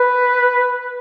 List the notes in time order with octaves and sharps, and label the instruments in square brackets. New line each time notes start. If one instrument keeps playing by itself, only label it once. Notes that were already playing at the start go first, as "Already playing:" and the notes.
Already playing: [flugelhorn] B4